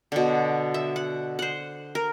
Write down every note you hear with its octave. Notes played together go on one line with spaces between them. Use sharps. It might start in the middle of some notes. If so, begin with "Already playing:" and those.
B2 D3
E5
F#5
C5 F#5
A#4